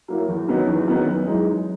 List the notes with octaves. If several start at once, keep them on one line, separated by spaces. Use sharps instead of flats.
F#3 A#3 E4
E2
D#3 F#3 B3 D#4
E2
D#3 F#3 B3 D#4
F#2
E3 G#3 D#4
F#2